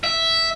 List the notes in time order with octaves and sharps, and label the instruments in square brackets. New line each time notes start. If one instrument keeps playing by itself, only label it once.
[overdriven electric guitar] E5